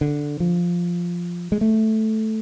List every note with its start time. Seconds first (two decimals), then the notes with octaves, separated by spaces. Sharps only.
0.01 D3
0.40 F3
1.52 G#3
1.61 A3